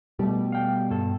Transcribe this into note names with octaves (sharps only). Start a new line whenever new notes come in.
B2 G3 A3
F5 G5
G2 A4